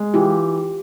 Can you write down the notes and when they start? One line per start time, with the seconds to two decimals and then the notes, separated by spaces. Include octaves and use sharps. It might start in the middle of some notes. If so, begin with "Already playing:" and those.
Already playing: G#3
0.14 E3 F4 G4